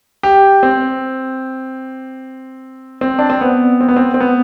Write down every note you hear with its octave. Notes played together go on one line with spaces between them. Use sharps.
G4
C4
C4
D4
C4
B3
C4
B3
C4
C4
B3